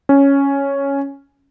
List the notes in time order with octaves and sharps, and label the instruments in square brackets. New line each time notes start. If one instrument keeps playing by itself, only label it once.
[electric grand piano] C#4